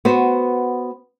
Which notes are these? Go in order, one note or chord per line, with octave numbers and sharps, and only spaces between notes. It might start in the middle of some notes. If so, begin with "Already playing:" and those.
B3 F#4 C5